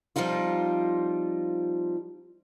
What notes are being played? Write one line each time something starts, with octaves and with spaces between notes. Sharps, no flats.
F3 G3 C4 D#4 F4